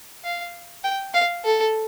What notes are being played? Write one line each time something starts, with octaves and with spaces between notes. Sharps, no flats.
F5
G5
F5
A4